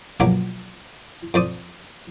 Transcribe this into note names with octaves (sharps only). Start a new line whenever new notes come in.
A#1 B2 F3 F#3 D6
F2 C5 D5 D#6